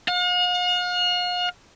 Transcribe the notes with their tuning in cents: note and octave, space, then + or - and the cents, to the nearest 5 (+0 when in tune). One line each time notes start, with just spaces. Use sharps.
F5 +45